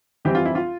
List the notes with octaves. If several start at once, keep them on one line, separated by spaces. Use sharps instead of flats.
F2 E3 G3 C4 G4
F4
E4
F4